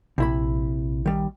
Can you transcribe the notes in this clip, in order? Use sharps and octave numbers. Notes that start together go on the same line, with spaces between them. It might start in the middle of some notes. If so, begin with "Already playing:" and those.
A#1 C3 E4 B5
D#3 G3